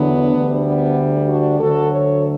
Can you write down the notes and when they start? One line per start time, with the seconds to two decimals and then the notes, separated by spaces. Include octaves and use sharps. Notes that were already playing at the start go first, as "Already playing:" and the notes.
Already playing: E2 D3 F#3 B3 D4
0.34 D2 D3 G3
0.65 B3 D4
1.28 D4 F#4
1.60 D2 D3 F#3 F#4 A4
1.92 A4 C#5